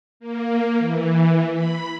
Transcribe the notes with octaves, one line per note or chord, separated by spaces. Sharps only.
A#3
E3
B5